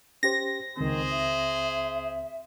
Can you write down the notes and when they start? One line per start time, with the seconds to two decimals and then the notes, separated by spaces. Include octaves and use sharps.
0.23 C#4 G4 C5 A#6
0.77 C#2 D#3 C4 G#4 C5
1.11 E5